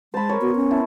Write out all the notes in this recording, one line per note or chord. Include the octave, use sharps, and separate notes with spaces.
G#3 C5 A5 B5
A#4 C#5
B3 F#4
C#4
E4 A5